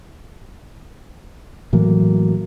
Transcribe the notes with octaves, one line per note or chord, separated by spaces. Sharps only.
A2 E3 F#3 A#3